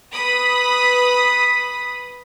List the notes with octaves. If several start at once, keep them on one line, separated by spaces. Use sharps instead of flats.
B4 B5 D#6